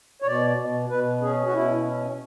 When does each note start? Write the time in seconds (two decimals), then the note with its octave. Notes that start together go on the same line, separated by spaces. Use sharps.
0.22 C#5
0.26 B2 D5
0.58 B2
0.89 B2 B4
1.22 C#4 G#4
1.47 F#4
1.54 B2 E4
1.85 C#4
2.07 C#4